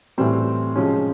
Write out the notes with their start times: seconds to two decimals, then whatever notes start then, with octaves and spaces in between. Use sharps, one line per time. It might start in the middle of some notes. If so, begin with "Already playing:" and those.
0.18 A2 E3 G3 C4
0.76 C3 F3 G#3 C#4